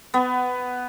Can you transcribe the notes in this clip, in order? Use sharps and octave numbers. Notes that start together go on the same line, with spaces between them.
B3